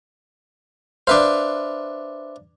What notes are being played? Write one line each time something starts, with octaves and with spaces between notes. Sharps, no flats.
D4 B4 C5 E5 F5